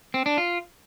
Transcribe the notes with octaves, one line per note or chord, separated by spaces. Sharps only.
C4
D4
F4